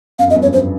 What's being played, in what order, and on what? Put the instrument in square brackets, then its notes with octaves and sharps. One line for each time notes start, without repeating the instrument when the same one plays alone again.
[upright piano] F#2 [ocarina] F5
[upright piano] F2 [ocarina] D#5
[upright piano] G2
[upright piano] F#2 [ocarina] C#5
[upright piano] F#2 [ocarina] C5